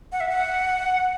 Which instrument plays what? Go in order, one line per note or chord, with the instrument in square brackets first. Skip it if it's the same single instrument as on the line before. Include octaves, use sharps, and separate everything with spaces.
[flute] F#5
E5
F#5